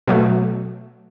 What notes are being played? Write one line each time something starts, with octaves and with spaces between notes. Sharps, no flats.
B2 F#3 A3